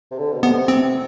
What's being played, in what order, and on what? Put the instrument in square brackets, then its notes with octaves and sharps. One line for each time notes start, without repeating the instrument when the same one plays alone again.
[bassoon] C3
D3
B2
[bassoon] C3 [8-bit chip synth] B3
[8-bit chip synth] C4